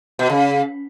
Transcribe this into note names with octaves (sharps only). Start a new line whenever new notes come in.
B2
C#3